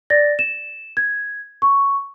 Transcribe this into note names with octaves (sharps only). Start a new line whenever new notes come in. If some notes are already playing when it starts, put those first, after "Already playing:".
D5 A6 A#6
E7
G#6
C#6